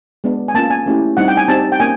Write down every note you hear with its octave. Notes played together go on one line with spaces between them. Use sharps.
G#3 B3 D4
G#5
A#3 C#4 F4 A5
G#5
A3 C#4 E4 G4
G3 C4 D#4 F#5
G5
G#5
C4 D#4 G4 A5
G5
A#3 C#4 G#5